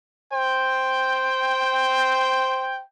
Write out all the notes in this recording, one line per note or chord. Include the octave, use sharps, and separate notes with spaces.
C5 G5